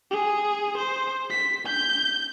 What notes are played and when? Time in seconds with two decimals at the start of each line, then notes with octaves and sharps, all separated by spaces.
0.11 G#4
0.77 C5
1.30 B6
1.67 G6